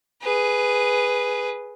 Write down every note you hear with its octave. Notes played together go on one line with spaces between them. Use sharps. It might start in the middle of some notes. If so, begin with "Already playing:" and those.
G#4 B4